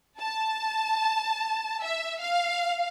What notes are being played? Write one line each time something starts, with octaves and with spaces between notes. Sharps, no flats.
A5
E5
F5